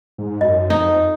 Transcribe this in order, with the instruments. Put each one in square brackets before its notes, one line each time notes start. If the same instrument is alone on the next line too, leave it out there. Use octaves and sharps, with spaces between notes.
[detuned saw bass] G#2
[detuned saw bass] F#2 [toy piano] D#5
[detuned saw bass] F2 [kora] D#4